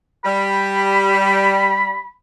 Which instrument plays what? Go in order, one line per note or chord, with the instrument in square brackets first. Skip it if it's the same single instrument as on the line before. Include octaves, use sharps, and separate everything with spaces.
[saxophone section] G3 [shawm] B5